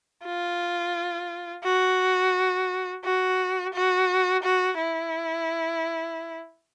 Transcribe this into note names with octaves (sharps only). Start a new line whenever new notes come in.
F4
F#4
F#4
F#4
F#4
E4